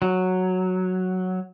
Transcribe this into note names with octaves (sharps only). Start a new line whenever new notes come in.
F#3